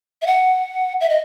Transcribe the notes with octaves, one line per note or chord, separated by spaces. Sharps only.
E5
F#5
E5
D#5